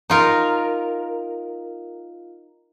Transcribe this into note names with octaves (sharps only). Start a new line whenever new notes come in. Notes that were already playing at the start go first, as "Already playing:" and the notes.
D#4 F4 A#4